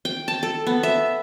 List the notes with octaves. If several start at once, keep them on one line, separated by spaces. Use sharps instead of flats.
G5
A5
A4
B3
E5